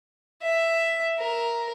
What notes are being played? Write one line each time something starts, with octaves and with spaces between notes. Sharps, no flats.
E5
A#4